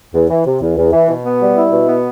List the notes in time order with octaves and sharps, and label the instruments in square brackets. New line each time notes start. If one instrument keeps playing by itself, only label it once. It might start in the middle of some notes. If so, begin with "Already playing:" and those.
[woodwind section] E2
E3
C3
E2
E2
E3
B2
B3
G3
E4
B2
B3